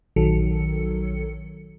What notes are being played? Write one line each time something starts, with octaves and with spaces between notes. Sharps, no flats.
A#1 D#3 F#3 A4 C#7